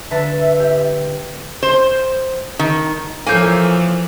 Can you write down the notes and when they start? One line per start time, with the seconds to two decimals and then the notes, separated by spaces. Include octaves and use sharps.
0.11 D3 B4 E5 A5
0.60 G4
1.63 C5
2.59 D#3
3.26 E3 F3 A#3 A4 C#5 G#5 G6